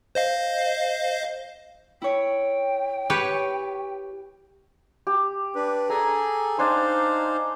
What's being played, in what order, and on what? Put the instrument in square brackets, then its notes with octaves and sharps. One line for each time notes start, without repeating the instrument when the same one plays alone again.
[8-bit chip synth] C5 D#5 F5
[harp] E4 C#5 [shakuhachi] G5
[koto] G4 B4 C#5 [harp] C#6
[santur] G4
[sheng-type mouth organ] D4 B4
[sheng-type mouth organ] G#4 A4 G#5 [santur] A#5
[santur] D4 G#5 C6 [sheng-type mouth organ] D#4 C5 F5